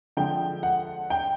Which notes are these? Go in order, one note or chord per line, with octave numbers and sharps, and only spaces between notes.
D3 F3 G#3 G5
F#5
G5